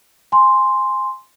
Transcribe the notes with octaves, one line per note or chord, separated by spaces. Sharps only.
G#5 C6